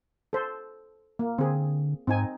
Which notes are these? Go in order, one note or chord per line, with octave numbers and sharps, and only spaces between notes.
A4 C5
A#3
D3 C4 G#4
G#2 C4 D#4 G#5